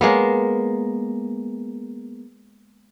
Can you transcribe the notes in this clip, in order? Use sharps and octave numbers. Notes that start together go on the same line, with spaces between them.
G#3 A#3 B3